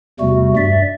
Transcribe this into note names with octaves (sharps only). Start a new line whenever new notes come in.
E2 C3 G3 A3 F#4
G2 D5 E5